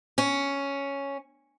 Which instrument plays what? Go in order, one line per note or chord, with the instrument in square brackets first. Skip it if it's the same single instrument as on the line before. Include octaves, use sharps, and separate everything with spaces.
[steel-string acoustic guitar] C#4